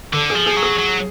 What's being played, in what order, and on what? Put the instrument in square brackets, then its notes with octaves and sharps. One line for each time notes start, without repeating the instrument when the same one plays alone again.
[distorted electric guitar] D3 [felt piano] A4
[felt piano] G#4
[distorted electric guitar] F3
[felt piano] G#4
[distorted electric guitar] F#3
[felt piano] G#4
[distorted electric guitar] F#3